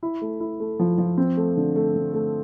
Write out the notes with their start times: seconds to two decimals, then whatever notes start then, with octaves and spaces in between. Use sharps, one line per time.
0.03 E4
0.22 A3
0.40 E4
0.60 A3
0.80 F3
0.98 F3
1.17 C4
1.37 A3
1.57 D3
1.76 A3
1.96 D3
2.14 A3